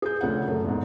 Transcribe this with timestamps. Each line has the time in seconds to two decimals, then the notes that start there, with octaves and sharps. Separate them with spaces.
0.02 G#4 G6
0.21 D2 C#3 F3 F#5
0.47 F#2 A3
0.64 E2 G#2